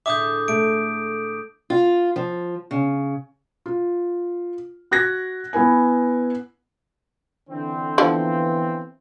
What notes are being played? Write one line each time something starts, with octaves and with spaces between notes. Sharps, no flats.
A2 D3 G#3 E5 D6 D#6 G6
A3 D7
F4
F3
C#3
F4
F#4 F#6 G#6 A#6
B3 E4 B4 G#5
D3 E3 C4
D3 E3 F3 B3 C4